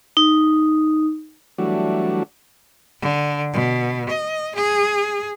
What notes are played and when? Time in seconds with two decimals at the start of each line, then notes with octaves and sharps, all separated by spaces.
0.17 D#4
1.58 E3 F#3 G3 A3 D4 F#4
3.00 D3
3.53 B2
4.09 D#5
4.55 G#4